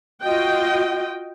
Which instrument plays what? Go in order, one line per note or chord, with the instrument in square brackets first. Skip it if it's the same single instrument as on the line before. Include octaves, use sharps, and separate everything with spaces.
[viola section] F4 F#4 D#5 G5